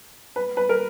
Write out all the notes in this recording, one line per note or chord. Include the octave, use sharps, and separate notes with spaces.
B4
B4
A#4